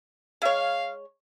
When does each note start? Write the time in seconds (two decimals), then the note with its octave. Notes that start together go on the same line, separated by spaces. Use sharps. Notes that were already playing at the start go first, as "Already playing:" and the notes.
0.42 G#3 C#5 F5